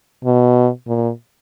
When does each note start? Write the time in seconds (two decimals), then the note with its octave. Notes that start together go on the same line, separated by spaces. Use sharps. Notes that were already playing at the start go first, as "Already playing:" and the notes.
0.25 B2
0.87 A#2